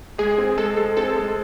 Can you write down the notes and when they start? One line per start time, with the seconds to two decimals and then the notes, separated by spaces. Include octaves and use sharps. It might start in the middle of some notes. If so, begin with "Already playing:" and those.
0.18 G#3 G#4
0.38 C4
0.58 G#3 A4
0.77 G#3
0.97 C4 A4
1.16 G#3